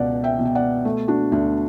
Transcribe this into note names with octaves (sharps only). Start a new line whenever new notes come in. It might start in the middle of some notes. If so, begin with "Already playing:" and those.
Already playing: C#2 B2 D5 F#5
E5 G5
B2
G5
D5 F#5
A3
D4 F#4
D2 D4